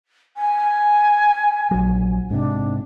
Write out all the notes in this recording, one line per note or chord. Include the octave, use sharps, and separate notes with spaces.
G#5
A#1 F#3
G#2 C3 D4